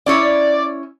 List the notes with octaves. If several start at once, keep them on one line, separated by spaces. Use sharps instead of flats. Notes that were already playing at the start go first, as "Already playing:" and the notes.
C#4 E4 C#5 D5